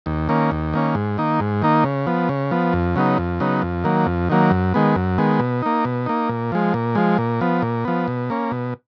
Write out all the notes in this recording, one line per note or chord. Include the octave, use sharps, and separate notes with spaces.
D#2
D#3 A#3 C#4
D#2
D#3 A#3 C#4
G#2
D#3 A#3 D#4
G#2
D#3 A#3 D#4
C#3
F3 B3
C#3
F3 B3
F2
C#3 F#3 B3 D#4
F2
C#3 F#3 B3 D#4
F2
D#3 F#3 A#3
F2
D#3 F#3 A#3
F#2
D#3 G#3 B3
F#2
D#3 G#3 B3
B2
A#3 D#4
B2
A#3 D#4
A#2
F3 G#3
A#2
F3 G#3
A#2
F3 B3
A#2
F3 B3
B2
A#3 C#4
B2